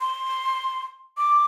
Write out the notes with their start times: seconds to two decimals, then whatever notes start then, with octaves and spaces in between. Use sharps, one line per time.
0.01 C6
1.17 D6